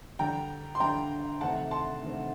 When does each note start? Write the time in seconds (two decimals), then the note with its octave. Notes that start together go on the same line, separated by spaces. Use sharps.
0.19 D3 G3 D4 G5 A#5
0.75 C6
0.80 D3 G3 D4 G5 A#5
1.41 C3 D#3 A3 D4 F#5 A5
1.71 A5 C6
2.02 C3 D#3 A3 D4